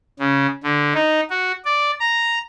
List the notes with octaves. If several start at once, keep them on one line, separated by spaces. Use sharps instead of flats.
C#3
D3
D#4
F#4
D5
A#5